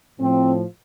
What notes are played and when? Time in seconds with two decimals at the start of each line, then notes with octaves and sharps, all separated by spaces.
0.20 A2 F3 C4